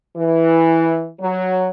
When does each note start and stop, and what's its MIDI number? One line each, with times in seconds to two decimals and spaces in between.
0.17 1.09 52
1.20 1.69 54